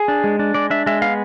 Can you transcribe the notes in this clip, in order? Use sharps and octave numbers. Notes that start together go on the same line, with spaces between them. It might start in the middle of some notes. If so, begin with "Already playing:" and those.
Already playing: G#4
D4
G#3
D4
G#3 D5
D4 E5
G#3 E5
B3 F5